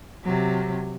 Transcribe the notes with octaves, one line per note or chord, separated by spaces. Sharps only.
C3 F#3